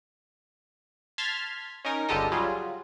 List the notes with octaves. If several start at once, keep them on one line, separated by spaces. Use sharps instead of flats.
A5 C6 F6 G#6 A6 B6
C#4 D#4 A#4
G1 C#2 D3 G4 A4 D#5
F#3 G3 F4 G#4